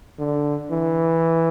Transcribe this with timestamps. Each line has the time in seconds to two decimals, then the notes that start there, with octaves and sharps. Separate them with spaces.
0.19 D3
0.71 E3